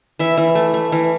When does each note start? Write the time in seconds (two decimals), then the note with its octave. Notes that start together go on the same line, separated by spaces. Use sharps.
0.19 E3 E5
0.37 E3
0.55 A3
0.74 A3
0.92 E3